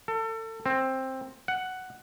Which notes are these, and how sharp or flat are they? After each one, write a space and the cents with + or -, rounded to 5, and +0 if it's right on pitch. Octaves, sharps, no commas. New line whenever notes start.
A4 +30
C4 +10
F#5 +5